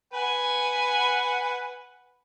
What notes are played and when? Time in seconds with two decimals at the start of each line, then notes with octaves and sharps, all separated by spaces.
0.13 B4 F#5 G#5